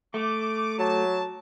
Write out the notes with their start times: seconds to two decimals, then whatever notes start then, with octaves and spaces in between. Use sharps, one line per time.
0.14 A3 D6
0.79 F#3 A5